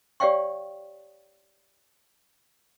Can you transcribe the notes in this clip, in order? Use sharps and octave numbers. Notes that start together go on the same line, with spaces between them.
G4 C#5 D5 F5 G5 C#6